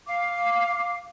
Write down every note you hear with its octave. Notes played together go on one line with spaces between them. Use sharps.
F5 D6